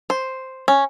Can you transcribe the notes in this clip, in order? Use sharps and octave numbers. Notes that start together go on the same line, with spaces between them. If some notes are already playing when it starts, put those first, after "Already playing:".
C5
C#4